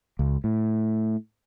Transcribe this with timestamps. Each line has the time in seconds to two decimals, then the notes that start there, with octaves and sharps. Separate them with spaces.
0.19 C#2
0.44 A2